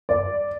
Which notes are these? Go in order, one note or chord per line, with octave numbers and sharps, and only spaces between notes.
D5